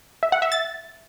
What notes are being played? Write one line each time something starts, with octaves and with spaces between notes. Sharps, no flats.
E5
F#5
E5
A6